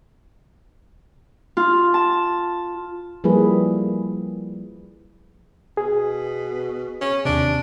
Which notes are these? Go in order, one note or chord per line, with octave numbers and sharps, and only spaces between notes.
F4
A5
F3 G3 A#3 E4 G#4 B4
B2 G#4
C#4
D#2 C3 D4